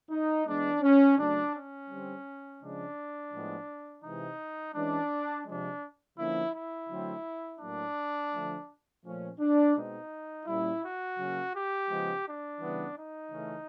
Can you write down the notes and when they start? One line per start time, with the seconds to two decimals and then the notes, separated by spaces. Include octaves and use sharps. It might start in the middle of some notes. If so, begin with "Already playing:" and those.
0.11 D#4
0.47 E3 G#3 B3 D4
0.82 C#4
1.18 C#3 F#3 A3 D4
1.55 C#4
1.89 D3 G3 C4
2.61 C#3 F3 G#3 D4
3.32 A2 F3 G#3 B3
4.05 C3 E3 G#3 D#4
4.75 E3 G#3 C#4 D4
5.46 C3 F3 G#3 D4
6.18 D3 F3 A#3 C#4 E4
6.54 E4
6.89 D3 F#3 A3 C4
7.60 A2 F#3 A#3 D4
8.32 D3 F3 A3
9.04 A#2 F3 A3 C#4
9.40 D4
9.75 B2 G#3 C4 D#4
10.46 A#2 G3 A#3 C#4 E4
10.82 F#4
11.18 C#3 F#3 A#3 C#4
11.54 G4
11.90 C#3 F3 G#3 B3
12.25 D4
12.61 C#3 E3 G3 B3
12.96 D#4
13.32 C#3 E3 A3 C#4